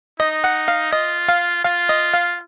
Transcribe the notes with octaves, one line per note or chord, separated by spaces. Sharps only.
D#4 D#5
F#5
F5
F4 D#5
F5
F4 F5
D#5
F5